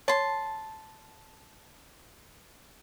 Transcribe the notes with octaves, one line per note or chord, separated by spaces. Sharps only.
C#5 A5 C6